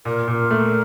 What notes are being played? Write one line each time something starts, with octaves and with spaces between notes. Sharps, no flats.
A#2 A#4
A#2
A3